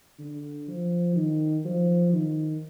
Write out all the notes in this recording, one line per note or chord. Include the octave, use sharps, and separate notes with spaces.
D3
F3
D#3
F3
D#3